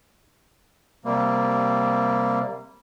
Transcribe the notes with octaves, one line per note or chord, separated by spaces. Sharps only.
C3 G3 A#3